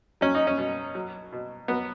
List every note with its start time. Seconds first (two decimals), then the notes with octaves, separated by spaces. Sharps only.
0.21 F#3 C#4
0.35 D#4
0.47 C#4
0.58 B2
0.95 F#3
1.32 B2
1.68 F#3 B3